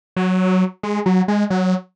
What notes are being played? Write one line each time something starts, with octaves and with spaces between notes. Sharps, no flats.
F#3
G#3
F#3
G#3
F#3